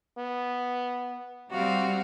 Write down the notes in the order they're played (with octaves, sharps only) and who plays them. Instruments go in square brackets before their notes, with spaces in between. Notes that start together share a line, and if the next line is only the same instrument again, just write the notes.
[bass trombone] B3
[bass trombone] C3 [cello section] G3 C4 [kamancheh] F#4 F5